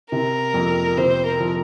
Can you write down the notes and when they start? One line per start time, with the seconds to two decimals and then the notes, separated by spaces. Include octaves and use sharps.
0.11 C3 A#4
0.54 F2
0.97 C3 C5
1.26 A#4
1.40 F3